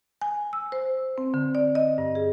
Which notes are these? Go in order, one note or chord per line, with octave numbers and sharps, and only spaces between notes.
G#5
E6
C5
C4
D3
D5
D#5
G2
G#4